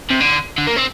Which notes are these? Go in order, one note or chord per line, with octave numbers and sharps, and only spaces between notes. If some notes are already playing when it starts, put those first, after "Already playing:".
C3
D3
D3
A#3
C4